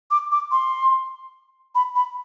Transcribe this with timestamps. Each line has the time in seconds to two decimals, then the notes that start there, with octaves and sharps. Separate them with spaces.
0.11 D6
0.32 D6
0.52 C6
1.75 B5
1.96 B5